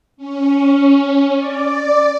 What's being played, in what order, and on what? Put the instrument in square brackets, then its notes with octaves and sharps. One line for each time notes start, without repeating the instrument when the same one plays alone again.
[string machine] C#4
D5